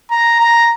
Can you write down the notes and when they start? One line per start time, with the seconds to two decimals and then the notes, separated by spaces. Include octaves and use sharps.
0.10 A#5
0.39 A#5